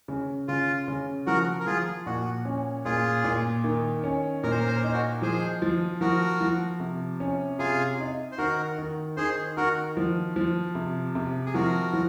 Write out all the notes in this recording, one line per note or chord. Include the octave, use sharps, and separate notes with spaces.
C#3
C#3 F4
C#3
F3 F#4 A#4
A#4
F3 F4 G#4
A#2 F#4
C#4
A#2 F4 G#4
A#2
D#3
C#4
A#2 A#4
C5
A#4
C5
A#4
D#4 C5
F#4 A#4
F3 G#4 C5
F3
F3 F#4 A#4
F3
C3
C#4
C3 F4 G#4
D#4
C5
D#3 F#4 A#4
D#3
D#3 G#4 C5
D#3 F#4 A#4
F3
F3
C3
C3
G#4
F3 F#4 A#4
F3